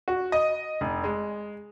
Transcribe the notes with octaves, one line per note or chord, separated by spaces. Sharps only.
F#4
D#5
F1
G#3